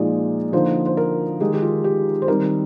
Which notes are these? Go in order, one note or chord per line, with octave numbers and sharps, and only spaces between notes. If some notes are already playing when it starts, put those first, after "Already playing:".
Already playing: A#2 F3 G#3 D#4 D5
D3 F3 A#3 D#4 C5
C5
A#4
D#3 G#3 D#4 G4
G4
F4
G4
C5
D#3 G3 C4 D#4 A#4